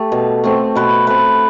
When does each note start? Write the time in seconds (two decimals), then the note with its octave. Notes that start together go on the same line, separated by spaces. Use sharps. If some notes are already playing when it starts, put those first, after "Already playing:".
Already playing: A3 G4 A4
0.12 B2
0.44 A3 C4
0.76 B2 B4
1.07 A3 C4 B4